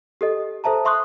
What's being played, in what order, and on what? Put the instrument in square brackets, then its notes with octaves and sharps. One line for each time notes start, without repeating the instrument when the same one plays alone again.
[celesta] G4 A4 D#5
A4 C5 E5 A5 A#5
E5 C6 C#6 D#6 F#6